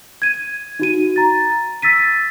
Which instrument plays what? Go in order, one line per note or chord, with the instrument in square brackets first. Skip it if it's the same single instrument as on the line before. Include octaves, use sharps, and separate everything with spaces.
[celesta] G#6 D#7
D#4 F#4 D#7
A#5 A6
E6 A6 B6 D#7